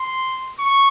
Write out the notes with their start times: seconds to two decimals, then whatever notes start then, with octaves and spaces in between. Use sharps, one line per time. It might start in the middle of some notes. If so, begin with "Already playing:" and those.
Already playing: C6
0.59 C#6